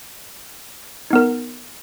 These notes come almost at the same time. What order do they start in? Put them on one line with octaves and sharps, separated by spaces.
D#4 B3 A#4